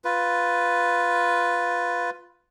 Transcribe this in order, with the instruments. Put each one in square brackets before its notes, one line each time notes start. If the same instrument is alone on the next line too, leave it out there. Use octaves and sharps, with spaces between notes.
[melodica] F4 B4